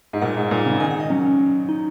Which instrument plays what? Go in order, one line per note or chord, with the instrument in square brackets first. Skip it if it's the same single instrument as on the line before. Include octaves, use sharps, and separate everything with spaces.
[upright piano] G#2
[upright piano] A#2 [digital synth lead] F#5
[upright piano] G#2
A#2
C#3
[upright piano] D#3 [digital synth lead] G#5
[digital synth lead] F#5
D#5
[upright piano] F#3 [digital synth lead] C#4
[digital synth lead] C#4
D#4